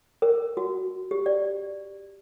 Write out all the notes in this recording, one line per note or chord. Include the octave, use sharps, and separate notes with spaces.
A#4
F#4
G4
D5